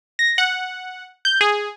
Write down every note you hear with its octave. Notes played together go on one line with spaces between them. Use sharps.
A#6
F#5
G6
G#4